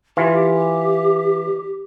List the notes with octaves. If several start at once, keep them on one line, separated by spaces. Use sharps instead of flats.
E3 F4 G4